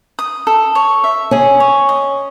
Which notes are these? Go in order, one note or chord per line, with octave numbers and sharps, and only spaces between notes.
D#6
A4
C#5
E5
C#4 G#4
C#5
D#5